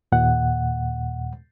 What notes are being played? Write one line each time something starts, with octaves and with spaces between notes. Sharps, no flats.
D#2 A#2 F#5